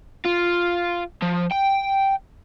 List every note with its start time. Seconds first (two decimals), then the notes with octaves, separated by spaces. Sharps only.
0.25 F4
1.22 F3
1.51 G5